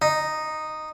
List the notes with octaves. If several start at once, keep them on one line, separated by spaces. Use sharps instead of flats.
D#4